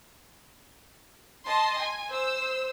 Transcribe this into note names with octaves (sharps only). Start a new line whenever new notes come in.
D#5 A5 C6
G#5
C5 E6